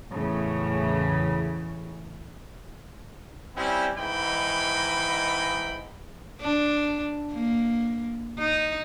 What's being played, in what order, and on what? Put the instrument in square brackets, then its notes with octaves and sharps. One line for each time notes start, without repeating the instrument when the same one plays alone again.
[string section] E2 A2 C#3
[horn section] G3 C4 C#4 E4
G#2 E3 D#4 G5 B5
[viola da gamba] D4
A#3
D#4